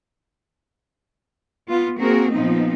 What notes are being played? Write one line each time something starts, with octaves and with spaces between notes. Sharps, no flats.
B3 F4
A#3 C4 F#4 G#4 A#4
A#2 F3 B3 C4 D#4